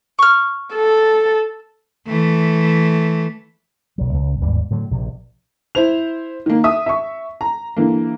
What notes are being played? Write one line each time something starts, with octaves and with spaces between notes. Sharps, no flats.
C#6 F6
A4
E3 A3
B1 F#3
C#2
G1 D#2 G#2 G3
A2 D3 F#3
A#1 C3
E4 C5 F7
D#3 A#3
E5 D#6
E5 C#6
A#5
D3 E3 A#3